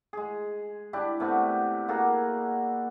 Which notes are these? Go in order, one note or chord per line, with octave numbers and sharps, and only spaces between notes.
G#3 G#4
D4 E4 G4
C3 A3 B3
A#3 F#4 G#4 A4